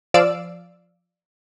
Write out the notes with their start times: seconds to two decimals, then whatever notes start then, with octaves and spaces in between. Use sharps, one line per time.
0.14 F3 D5 F5 E6 D7